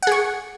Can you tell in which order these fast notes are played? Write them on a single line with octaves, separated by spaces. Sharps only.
F#5 G#4 C#6